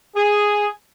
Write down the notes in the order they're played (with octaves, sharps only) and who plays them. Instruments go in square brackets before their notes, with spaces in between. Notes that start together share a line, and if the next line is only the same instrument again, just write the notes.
[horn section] G#4